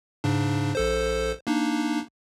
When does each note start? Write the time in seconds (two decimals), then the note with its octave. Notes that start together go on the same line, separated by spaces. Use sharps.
0.24 G#2 C#3 D4
0.75 A#1 A4 C5
1.47 A#3 D4 D#4